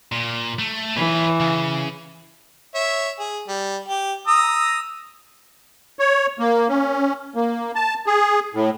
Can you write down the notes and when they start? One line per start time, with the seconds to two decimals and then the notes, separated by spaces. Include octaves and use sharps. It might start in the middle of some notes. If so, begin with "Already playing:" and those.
0.12 A#2
0.59 A3
0.97 E3 B4 C#5
1.40 C#3
2.75 C#5 E5
3.19 G#4
3.47 G3
3.88 G4
4.27 A#5 D#6 E6
5.99 C#5
6.39 A#3
6.69 C#4
7.35 A#3
7.75 A5
8.06 G#4
8.54 A2